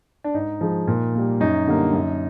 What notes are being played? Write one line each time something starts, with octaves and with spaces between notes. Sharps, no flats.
D4
G#2 D#4
F3 G#3
A#2
G3 A#3
F#2 D#4
D3 G3 A#3
F#2